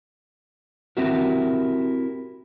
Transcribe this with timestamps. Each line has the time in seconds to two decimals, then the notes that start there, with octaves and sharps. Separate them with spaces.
0.97 C4 E4 F#4 G4 A#4